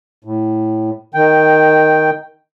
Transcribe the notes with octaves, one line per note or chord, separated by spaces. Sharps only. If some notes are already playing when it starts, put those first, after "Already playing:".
A2
D#3 G5